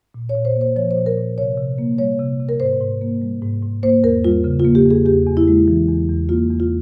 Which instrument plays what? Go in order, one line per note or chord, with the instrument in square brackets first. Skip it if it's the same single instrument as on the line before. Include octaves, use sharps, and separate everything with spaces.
[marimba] A#2
C#5
A#2
C5
A#3
C5
F3 C#5
C5
A#2
A#4
A#2
C3 C#5
C3
A#3
G3 C#5
C3
C3
A#4
G#2 C5
G#2
A#3
G3
G#2
G#2
A#3 C5
E2 A#4
G3 F4
C#3
F4
A#3
G4
E2 G#4
E2 G4
E2
E4
G#3
E3
E2
E2
A#3 F4
E2
F4